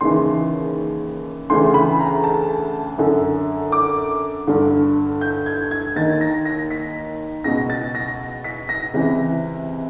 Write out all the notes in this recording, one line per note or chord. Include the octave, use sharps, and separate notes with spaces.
D#2 C#3 E3 C6
D2 C#3 E3 C6
B5
A#5
A5
F#2 D3
D6
G2 D3
G6
G#6
G#6
D#2 D#3 A6
A#6
A#6
B6
C#2 B2 A#6
A6
A#6
B6
A#6
C#2 C3 E3